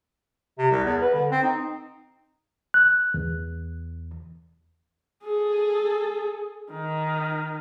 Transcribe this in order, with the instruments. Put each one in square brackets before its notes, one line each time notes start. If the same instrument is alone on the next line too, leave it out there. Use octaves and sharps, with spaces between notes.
[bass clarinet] C3
C2
E2
B4
D3
C4
D#4
[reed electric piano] F#6
E2
[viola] G#4 A4
D#3